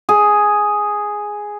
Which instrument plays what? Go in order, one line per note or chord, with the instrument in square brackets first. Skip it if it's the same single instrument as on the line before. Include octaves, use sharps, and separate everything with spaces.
[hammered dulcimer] G#4